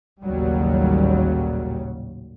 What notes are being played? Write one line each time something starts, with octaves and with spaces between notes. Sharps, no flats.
A1 D#2 A#2 C#3 F#3 G3